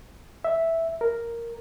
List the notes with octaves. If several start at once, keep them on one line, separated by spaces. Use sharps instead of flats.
E5
A#4